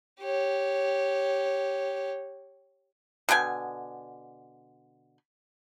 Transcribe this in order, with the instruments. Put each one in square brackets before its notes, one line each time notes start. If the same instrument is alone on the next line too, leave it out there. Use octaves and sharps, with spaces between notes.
[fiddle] G4 C#5
[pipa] B2 D3 G5 G#5